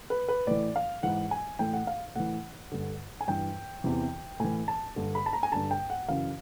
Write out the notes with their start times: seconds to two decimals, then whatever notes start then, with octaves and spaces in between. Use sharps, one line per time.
0.10 B4
0.28 B4
0.47 A2 E3 D5
0.76 F5
1.03 G#2 E3 F#5
1.31 G#5
1.59 A2 E3 G5
1.73 F#5
1.87 F5
2.16 A2 E3 F#5
2.72 G2 D3
3.21 G#5
3.28 G2 E3 G5
3.84 E2 C3 E3
4.40 A2 E3 G#5
4.68 A5
4.96 G2 D3
5.15 B5
5.26 A5
5.33 A#5
5.43 G#5
5.52 G2 D3 A5
5.71 G5
5.90 F#5
6.08 F#2 C#3 E3 F5